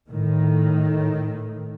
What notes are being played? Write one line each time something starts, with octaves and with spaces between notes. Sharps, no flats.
A2 D#3